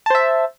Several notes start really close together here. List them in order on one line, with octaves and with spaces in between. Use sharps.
A5 C5 E5